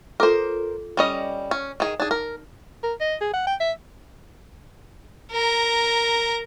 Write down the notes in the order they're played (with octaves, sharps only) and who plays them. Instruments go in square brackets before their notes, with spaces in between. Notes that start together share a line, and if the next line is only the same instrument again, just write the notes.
[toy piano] F4 A4 D6 [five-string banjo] A#4 C5
[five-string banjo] G3 C#4 D#5
C#4
D#3 G#4
[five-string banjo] D4 G#4 [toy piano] D#4
[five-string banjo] A#4
[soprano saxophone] A#4
D#5
G#4
F#5
G5
E5
[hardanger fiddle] A#4 A#5